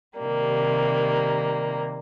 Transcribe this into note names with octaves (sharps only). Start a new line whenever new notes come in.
C3 D#3 G3 A#3